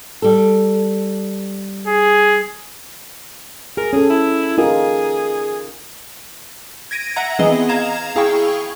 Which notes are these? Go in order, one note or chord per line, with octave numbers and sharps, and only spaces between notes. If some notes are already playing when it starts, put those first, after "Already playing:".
G3 A4
G#4
G#4 A#4
C#4 G#4 A4
E4
D#4 F4 G#4 A#4
G#6 A#6 D7 D#7
E5 F#5 A#5
E3 B3 C4 G#4 D#5
F5 A#5 G#6 E7
E4 G#4 F5 G5 C#6